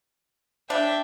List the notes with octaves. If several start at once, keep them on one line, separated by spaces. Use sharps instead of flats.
D4 E5 G5